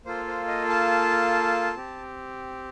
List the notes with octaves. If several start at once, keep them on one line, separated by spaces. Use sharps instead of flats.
A#3 F4 A4 C5
C5
D#5
A5
C4 G4